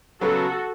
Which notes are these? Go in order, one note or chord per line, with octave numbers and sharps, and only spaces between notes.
C#3 F#3 B3 F#4 A4